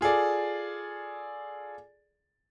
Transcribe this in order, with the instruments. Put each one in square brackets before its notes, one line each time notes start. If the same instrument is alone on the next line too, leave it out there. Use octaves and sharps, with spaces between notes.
[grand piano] F4 G#4 A4 D5